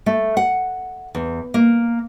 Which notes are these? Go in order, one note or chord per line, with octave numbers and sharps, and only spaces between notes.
A3
F#5
E2
A#3